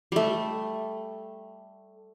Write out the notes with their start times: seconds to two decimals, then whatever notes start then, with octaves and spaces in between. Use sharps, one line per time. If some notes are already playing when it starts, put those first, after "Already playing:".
0.12 G3 A3